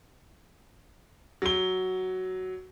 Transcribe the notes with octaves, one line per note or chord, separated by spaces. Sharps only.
F#3 G7